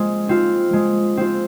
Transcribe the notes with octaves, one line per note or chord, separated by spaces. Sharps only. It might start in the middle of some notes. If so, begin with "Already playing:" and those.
Already playing: G#3 C4 F4
C4 F4
G#3
C4 F4